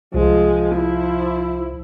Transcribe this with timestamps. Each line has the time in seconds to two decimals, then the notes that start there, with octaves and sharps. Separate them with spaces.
0.14 C2 F3 G#3
0.75 E4